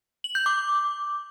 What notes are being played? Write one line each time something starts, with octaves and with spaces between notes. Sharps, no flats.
F#7
G6
D6